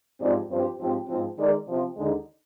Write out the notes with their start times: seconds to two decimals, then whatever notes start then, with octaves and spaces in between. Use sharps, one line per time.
0.20 G#2 F3 C4 G4 D5
0.50 G2 F3 C4 G4 C5
0.79 G#2 F3 C4 G4 C5
1.08 G#2 F3 C4
1.38 D#3 G#3 D#4 A#4 D5
1.68 C3 F3 C4
1.97 D#2 D3 G#3 D#4